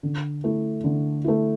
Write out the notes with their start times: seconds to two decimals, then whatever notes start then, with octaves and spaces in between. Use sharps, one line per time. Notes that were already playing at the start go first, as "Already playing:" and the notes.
0.03 D3
0.44 A3 E4
0.84 D3
1.24 A3 E4